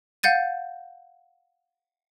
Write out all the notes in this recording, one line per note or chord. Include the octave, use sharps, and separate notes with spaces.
F5 F#5 G6 A6 D#7